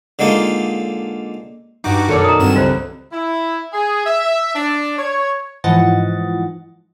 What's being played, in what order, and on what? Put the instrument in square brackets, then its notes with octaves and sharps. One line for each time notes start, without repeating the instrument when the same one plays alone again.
[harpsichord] D3 G#3 A#3 D#4 F4
[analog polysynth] G2 F#4 D6 [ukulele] D#4
[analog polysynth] F#2 B2 [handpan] D#3 A4 A#4 [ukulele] D#4 C#5 D5
[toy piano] A#5 D#6
[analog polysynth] G2 F#3 E7 [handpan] G3 C4
[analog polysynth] C#2 [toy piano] F4 C5
[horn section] E4
G#4
E5
D4
C#5
[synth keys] G#2 E3 F3 D#5 F#5 A6